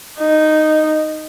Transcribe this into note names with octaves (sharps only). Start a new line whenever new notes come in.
D#4